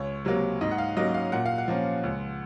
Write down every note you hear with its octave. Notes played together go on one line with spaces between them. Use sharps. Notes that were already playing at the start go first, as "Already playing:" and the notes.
Already playing: C#2 C#5
C3 F#3 A#3
G#2 D#5
F#5
F5
F#3 A#3 C#4 D#5
F5
A#2 F#5
F5
F#5
F3 A#3 C#4
C#2